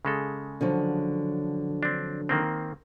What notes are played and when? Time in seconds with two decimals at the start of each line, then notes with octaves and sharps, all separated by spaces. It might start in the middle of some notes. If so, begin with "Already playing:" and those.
0.05 C#3 G#3 A4
0.61 D3 F3 F#3
1.83 C4 D4
2.29 D#3 A#3 C4